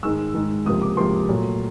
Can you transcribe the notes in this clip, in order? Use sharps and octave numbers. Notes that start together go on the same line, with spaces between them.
G#2 D#3 G#3 E6
G#2 D#3 G#3
C#2 C3 F3 A#3 D#6
D6
C#2 C3 F3 A#3 C6
A#2 F#3 A3